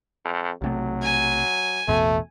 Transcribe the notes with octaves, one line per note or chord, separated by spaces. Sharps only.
F2
B1 C3 F#3 A3
G#5
A1 E2 B2 A3